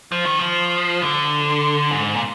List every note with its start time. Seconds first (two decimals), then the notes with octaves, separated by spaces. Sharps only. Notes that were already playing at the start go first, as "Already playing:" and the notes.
0.12 F3
0.25 D#3
0.39 F3
1.02 D3
1.91 G#2
2.16 A#2